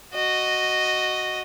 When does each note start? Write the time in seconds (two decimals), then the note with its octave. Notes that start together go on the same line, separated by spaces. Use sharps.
0.14 F#4 D#5